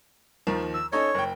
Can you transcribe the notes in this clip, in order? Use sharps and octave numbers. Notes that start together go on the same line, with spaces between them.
D#2 D#3 F3
E6
C#4 D#4 A4 C#5
F#1 G5